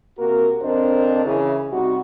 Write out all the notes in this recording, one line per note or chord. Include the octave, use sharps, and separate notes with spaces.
C3 A#3 F#4 A#4
F2 C4 D4 A#4 C5 D#5
C#3 E3
C3 G3 D#4 F#4